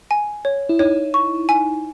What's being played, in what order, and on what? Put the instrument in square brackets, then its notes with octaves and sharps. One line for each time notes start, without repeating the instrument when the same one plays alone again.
[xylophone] G#5
C#5
[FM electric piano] E4
[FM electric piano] D#4 [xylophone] C#5
[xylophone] C#6
G#5